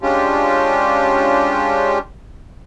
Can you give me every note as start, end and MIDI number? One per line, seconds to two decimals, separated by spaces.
0.01 1.98 56
0.01 1.98 61
0.01 1.98 62
0.01 1.98 65
0.01 1.98 67